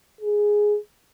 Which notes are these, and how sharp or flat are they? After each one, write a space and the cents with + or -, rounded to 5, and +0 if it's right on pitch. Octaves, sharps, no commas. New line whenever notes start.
G#4 +0